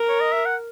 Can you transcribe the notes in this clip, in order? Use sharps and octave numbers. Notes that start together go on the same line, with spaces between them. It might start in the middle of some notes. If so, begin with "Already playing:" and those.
Already playing: A#4
C#5
D#5
E5
F#5